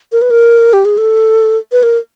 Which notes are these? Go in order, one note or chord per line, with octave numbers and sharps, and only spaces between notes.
A#4
B4
A#4
G4
G#4
A4
B4
A#4